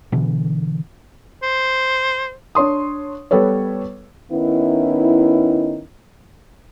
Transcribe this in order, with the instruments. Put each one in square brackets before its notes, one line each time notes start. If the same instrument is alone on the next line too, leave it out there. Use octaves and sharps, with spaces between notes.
[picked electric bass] B2 D3 E3
[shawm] C5
[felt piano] D4 C#5 C6 D#6
G3 B3 A4 B4 C#5
[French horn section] D#3 B3 C#4 D#4 E4